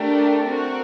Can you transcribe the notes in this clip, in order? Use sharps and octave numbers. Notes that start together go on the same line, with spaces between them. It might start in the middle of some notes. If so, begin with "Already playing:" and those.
Already playing: A3 D4 G4 A#4
C4 F#4 A#4